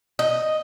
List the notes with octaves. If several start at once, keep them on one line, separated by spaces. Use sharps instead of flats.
D#5